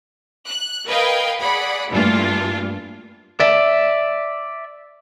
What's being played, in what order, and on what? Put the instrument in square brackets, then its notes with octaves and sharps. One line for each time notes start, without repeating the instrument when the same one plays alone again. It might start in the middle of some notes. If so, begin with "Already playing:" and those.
[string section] F#6
A#4 B4 D#5 F5 G5 G#6
G#4 D5 F#5 B5
G2 A#2 E3 A3 D4 F4
[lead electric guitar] D5 E5